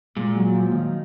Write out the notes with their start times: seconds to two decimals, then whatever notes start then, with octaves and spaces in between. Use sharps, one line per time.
0.16 A#2 G#3
0.35 F#3
0.53 F3
0.71 D#3